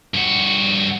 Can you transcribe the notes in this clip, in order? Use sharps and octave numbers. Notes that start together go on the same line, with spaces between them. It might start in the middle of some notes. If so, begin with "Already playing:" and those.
G2 F#4